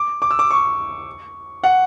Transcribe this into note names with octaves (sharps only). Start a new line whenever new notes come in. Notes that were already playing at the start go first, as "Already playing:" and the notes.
Already playing: D6
D6
E6
D6
C#6
F#5